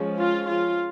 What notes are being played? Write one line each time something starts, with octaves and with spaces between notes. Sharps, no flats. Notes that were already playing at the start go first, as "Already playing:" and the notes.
Already playing: F3 G#3 C#4
F4
F4